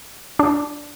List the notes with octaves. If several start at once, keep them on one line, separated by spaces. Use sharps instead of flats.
D4